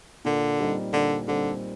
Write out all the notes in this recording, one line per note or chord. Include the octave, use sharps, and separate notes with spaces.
A#2 D3
G3 C4 D#4
A#2 D3
D3 G3 C4 D#4